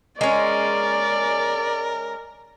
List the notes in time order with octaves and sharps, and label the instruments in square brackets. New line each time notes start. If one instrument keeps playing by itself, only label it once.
[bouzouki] G#3 C#4 [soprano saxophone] A#4 [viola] D5